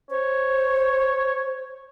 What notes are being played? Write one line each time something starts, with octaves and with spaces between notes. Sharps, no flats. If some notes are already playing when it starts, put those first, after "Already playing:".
C5 C#5